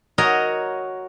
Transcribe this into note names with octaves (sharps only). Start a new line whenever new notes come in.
F#4 A#4 C#5 D#5